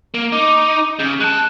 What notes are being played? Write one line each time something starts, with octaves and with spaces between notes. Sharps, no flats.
A#3
D#4 D6
C#3 G6
G#3 A5 F#6